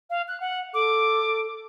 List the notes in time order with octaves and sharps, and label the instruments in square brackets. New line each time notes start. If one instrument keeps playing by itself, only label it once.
[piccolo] F5
F#6
F#5
[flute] A4 [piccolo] D6